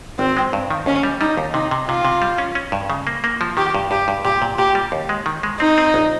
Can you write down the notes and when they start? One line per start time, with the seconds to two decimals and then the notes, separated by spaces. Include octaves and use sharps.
0.19 G#1 C4
0.37 G#3
0.53 G2
0.71 D#3
0.86 D#2 C#4
1.03 G3
1.21 G3 D#4
1.37 D#2
1.54 C3 D#4
1.71 C3
1.88 C3 F4
2.05 C3
2.22 G3
2.38 C#4
2.55 C#4
2.72 G2
2.90 C#3
3.07 A#3
3.24 A#3
3.41 F3
3.57 D#3 G4
3.74 G2
3.91 G2 G4
4.08 G2
4.25 A#2 G4
4.42 A#2
4.58 A#2 G4
4.75 G3
4.92 D#2
5.09 G#3
5.26 D#3
5.43 G#3
5.60 C4 D#4
5.78 C4
5.94 A#1